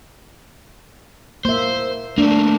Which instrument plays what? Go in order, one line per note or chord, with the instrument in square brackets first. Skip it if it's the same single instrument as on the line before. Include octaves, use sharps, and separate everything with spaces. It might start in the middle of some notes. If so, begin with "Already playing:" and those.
[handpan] A#3 E5 [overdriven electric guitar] C5
[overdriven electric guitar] A3 A#3 [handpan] D4